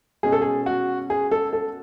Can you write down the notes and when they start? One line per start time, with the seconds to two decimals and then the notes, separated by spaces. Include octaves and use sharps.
0.23 B2 G#3 C#4 G#4
0.32 A4
0.42 G#4
0.66 F#4
1.10 G#4
1.31 A4
1.53 A4